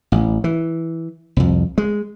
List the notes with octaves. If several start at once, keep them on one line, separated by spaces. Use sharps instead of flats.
A1
E3
C2 F2
G#3